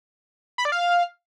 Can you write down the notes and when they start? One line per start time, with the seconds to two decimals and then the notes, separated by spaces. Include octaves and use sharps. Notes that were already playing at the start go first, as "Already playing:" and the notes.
0.58 B5
0.65 D5
0.72 F5